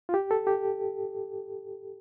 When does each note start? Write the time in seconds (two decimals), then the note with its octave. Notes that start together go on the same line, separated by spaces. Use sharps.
0.09 F4
0.14 G4
0.31 A4
0.47 G4